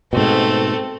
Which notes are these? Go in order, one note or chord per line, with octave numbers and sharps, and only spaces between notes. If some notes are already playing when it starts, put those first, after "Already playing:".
G#2 B2 A3 C4